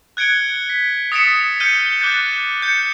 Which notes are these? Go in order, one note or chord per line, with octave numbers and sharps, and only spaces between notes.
F#6 G#6 C#7 D7 G7
B6
D#6 A6 B6 C#7 D7 E7
F6 G6 C#7 D#7 G7
D6 F#6 G6 A6
G6 C#7